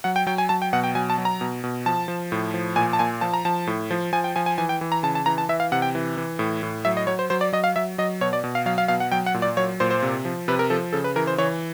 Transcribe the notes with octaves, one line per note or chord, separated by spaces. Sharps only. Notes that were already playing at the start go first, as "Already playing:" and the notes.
F#3 F#5
G5
F#3 G5
G#5
F#3 A5
G5
B2 F#5
G5
F#3 G#5
A5
F#3
A#5
B2
B2
F3 A5
F3
A2
F3
A#2 G#5
A5
A#2 G#5
F3 A5
A#5
F3 A5
A2
F3
F3 G#5
G5
F3 G#5
G#5
E3 G#5
G5
E3
A#5
C#3 A5
A5
E3 A#5
A5
E3 E5
F5
C3 F#5
G5
E3
E3
A2
A2
F#3 E5
D#5
F#3 C#5
C5
F#3 C5
D5
F#3 D#5
F5
F#3 E5
F#3 D#5
B2 C#5
D5
B2
F5
F#3 F5
F5
B2 F5
F#5
F#3 G5
F#5
A#2
D5
F#3 C#5
A#2 C5
C5
C3
F3
C3 B4
A#4
F3 A4
C#3 A4
B4
E3 A#4
C5
E3 C#5